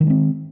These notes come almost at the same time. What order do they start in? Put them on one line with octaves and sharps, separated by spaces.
D#3 F3 G#3 C4